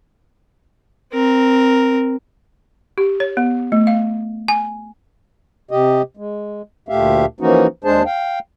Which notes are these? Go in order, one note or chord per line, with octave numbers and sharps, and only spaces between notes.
C4 A#4
G4
C#5
B3
A3
F5
G#5
C3 G4 D#5
G#3
D2 A#2 A3 G4 E5 F5
E3 F3 A#3 C#4 D#4 F#4
D#2 G#3 D4 G#4 C5 A5
F5 G5